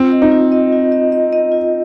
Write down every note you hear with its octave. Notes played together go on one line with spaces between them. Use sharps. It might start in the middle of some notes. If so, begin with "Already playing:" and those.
Already playing: C4 F4
D#5
D#4
F4
D#5
F4
D#5
D#5
D#5
F4